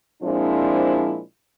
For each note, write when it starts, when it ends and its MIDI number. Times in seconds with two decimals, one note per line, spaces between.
0.22 1.20 46
0.22 1.20 53
0.22 1.20 56
0.22 1.20 60
0.22 1.20 62
0.22 1.20 64